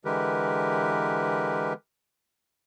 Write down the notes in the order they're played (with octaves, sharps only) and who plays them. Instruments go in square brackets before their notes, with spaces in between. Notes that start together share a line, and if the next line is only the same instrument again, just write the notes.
[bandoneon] D3 E3 G#3 G4 A#4 B4